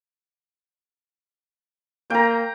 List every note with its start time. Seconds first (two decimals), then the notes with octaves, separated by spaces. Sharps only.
2.10 A#3 G5 A#5